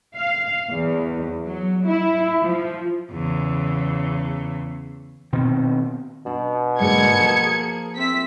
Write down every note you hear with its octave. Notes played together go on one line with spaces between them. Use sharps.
F5
E2
F#3
E4
F3
E2 C#3
B2 D#3 C4
B2 D4
G#2 D3 G#3 A#3 G#4 G#6 C#7
F3 A4
C4 E5 B6